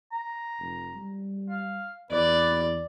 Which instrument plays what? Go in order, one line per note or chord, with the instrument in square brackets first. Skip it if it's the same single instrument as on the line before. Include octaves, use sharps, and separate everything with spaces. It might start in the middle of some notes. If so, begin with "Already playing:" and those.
[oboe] A#5
[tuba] F1
G3
[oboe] F5
[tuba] E2 [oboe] B4 [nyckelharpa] D5